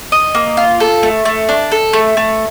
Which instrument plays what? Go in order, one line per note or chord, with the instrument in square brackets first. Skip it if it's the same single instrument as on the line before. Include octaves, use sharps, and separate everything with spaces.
[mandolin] D#5
A#3
F4
A4
A3
A3
D4
A4
A3
A3